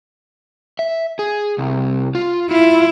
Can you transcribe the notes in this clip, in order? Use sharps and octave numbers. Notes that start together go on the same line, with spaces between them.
E5
G#4
C2
F4
E4 F4